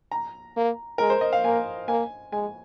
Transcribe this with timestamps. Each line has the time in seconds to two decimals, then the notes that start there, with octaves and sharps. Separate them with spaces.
0.11 A#5
0.57 A#3
0.98 G#3 A#4
1.10 C5
1.21 D#5
1.33 F5
1.44 A#3 G#5
1.88 A#3 G#5
2.32 G#3 G#5